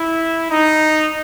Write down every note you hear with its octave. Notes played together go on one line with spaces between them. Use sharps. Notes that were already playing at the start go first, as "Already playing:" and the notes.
Already playing: E4
D#4